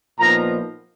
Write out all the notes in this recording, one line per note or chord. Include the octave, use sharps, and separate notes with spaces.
A#2 F3 B3 D#4 A#5